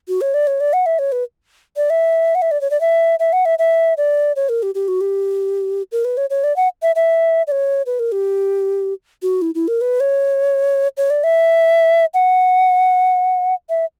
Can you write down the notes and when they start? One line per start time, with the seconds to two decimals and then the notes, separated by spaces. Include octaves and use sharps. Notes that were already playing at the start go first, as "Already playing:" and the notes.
0.08 F#4
0.21 C#5
0.34 D5
0.47 C#5
0.60 D5
0.73 F#5
0.86 E5
0.99 C#5
1.12 B4
1.76 D5
1.90 E5
2.35 F#5
2.42 E5
2.51 D5
2.61 C#5
2.71 D5
2.81 E5
3.19 E5
3.33 F#5
3.45 E5
3.59 E5
3.97 D5
4.36 C#5
4.49 A#4
4.62 G4
4.75 G4
4.88 F#4
5.01 G4
5.92 A#4
6.04 B4
6.17 C#5
6.30 C#5
6.44 D5
6.56 F#5
6.82 E5
6.95 E5
7.47 D5
7.51 C#5
7.86 B4
7.99 A#4
8.12 G4
9.22 F#4
9.42 E4
9.55 E4
9.68 A#4
9.81 B4
10.00 C#5
10.97 C#5
11.10 D5
11.23 E5
12.14 F#5
13.69 E5